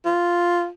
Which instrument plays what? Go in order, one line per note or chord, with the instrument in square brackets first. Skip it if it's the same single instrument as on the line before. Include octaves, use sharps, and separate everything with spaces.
[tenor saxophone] F4